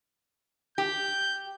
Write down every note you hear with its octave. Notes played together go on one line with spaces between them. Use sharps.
G4 G6